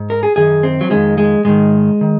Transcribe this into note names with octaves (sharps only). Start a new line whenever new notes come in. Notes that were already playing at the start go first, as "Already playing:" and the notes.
Already playing: G#2
A#4
G#4
F#2 D#3 G#4
C4
F#3
F2 D#3 G#3
G#3
G#2 D#3 G#3
D#3